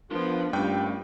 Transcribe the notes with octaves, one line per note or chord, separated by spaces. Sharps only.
F3 B3 D4 F4 A#4 B4 C6
G2 G3 A3 A#3 C#4 G5